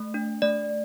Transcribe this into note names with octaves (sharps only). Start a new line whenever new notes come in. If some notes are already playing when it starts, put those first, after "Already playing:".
Already playing: A3
D4
A3 D5